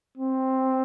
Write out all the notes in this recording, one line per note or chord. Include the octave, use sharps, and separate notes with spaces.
C4